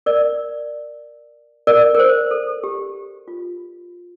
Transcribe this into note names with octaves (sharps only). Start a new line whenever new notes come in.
A#4 D5
A#4 D5
A#4
C5
A4
G4
F4